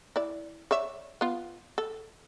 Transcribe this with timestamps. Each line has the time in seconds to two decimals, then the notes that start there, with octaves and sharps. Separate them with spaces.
0.16 E4 D5
0.71 C#5 D5 E5
1.21 B3 F4
1.78 A4